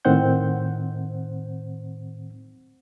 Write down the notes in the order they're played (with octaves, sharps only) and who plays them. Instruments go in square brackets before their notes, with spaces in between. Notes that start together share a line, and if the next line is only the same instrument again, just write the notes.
[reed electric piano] A2 D#3 C4 C5 F#5 G6